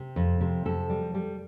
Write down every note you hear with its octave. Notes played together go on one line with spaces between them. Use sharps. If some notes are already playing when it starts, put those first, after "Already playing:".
Already playing: C3
F2
C3
F2 A4
G3
G3